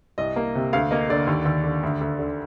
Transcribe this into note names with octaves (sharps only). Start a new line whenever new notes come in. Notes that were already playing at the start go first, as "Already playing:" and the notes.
C2 D#5
A#3
C3
D2 F5
A#3 D#5
D3 D5
D#2
D#2
D3
D2
D2
D3